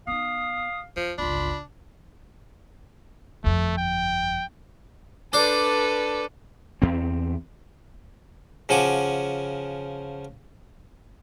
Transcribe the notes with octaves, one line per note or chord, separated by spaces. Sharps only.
B3 D#4 F5 D#6
F2 F3
G1 C#2 D4 F4 B5
G1 F2 A3
G5
D4 A4 B4 C5
E2 C4
C#3 F3 F#4 G#5 D6